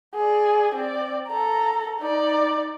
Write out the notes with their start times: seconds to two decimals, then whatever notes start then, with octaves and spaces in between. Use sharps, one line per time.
0.14 G#4 D5
0.75 C4 D5
1.28 A4 A#5
2.00 D#4 D5